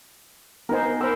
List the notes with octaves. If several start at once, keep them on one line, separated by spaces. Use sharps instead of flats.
B3 D#4 A#4 C5 G#5
A#4 C5 B5 E6